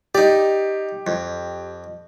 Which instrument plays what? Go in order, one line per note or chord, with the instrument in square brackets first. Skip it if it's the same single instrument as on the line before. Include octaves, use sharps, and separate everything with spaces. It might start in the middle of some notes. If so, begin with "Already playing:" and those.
[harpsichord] D#4 D5 [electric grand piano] G4
[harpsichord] F2